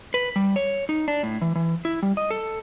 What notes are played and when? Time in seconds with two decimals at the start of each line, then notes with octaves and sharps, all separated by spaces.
0.14 B4
0.36 G3
0.56 C#5
0.89 D#4
1.08 D4
1.23 A2
1.42 E3
1.55 E3
1.85 E4
2.03 G3
2.17 D#5
2.30 A4